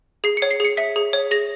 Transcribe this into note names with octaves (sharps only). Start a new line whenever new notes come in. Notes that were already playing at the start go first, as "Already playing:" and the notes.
G#4 C7
C#7
C#5
C7
G#4 C#7
E5 B6
G#4
C#5
G#4 A#6